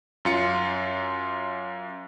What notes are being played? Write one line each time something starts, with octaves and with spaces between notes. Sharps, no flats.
F#2 F4 C#7